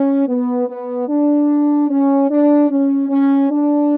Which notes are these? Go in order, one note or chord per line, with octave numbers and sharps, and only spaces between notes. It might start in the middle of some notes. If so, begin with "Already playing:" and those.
Already playing: C#4
B3
B3
D4
C#4
D4
C#4
C#4
D4